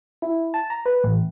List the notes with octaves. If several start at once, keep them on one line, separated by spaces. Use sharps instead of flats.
E4
A5
A#5
B4
A1